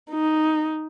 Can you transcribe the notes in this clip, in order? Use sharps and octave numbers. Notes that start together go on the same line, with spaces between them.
D#4